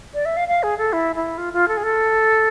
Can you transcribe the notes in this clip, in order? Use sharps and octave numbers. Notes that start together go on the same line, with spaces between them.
D5
E5
F5
F5
G#4
A4
E4
E4
F4
F4
A4
G#4
A4